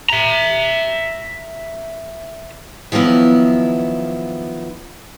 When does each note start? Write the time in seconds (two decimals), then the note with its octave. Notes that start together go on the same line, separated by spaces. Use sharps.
0.10 E5 A#5
2.92 D#3 F3 F#3 B3 E4